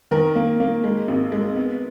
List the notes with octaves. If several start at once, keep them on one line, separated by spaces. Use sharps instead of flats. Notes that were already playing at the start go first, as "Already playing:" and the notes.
D#3 A#4
A#3
A#3
G#3
G#1
G#3
B3